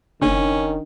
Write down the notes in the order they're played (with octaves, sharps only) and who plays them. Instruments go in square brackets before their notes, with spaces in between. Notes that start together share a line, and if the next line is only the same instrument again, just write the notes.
[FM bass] F#1 [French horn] D#3 [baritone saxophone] C#4 [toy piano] D4